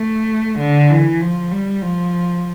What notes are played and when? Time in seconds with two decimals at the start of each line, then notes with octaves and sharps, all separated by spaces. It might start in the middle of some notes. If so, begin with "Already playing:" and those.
Already playing: A3
0.59 D3
0.90 E3
1.21 F3
1.51 G3
1.81 F3